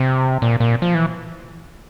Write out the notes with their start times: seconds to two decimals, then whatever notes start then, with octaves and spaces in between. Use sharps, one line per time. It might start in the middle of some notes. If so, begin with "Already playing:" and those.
Already playing: C3
0.42 A#2
0.60 A#2
0.82 F3
0.95 E3